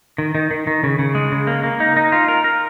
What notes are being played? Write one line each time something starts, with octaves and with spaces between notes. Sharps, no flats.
D#3
D#3
D#3
D#3
C#3
C#3
G#3
C#3
A#3
A#3
D#4
D#4
F4
A#4
A#4